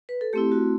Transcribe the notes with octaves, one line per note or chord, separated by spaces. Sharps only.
B4
A4
A3 C4 E4 G4
F#4